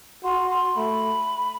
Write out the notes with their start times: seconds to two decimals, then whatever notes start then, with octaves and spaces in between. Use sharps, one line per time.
0.24 F#4 C6
0.50 C6
0.76 A3 B5